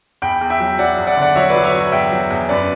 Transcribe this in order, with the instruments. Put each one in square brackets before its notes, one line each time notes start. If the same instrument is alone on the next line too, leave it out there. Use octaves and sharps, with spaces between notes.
[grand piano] E2 G5 B5
E2
E5 G5
F#3
F#3 D5 F#5
E2
D5 F#5
D3 D5 F#5
F#3 C#5 E5
B4 D5
F#3
C#5 E5
F#3
E2 E5 G5
F#3
E2
F#2 B4 D5